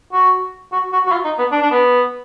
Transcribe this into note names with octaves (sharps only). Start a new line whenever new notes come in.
F#4
F#4
F#4
F#4
F4
D#4
B3
D4
D4
B3